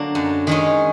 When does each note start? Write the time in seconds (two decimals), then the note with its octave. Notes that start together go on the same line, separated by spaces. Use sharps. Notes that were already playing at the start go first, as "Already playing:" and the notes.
Already playing: D3 F#3 A#3 D4
0.15 F#2
0.47 D#3 G#3 C#4